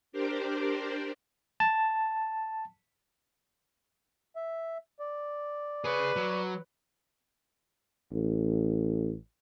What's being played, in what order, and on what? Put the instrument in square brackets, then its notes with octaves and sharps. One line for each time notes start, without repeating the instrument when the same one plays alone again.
[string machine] D4 G4 A#4 C5 D5
[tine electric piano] A5
[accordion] E5
D5
[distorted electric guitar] G#4 C#5 [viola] B4
[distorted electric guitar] F#3
[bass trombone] A1